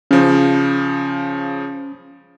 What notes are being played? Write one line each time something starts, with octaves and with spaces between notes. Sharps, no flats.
C#3 F3 C#4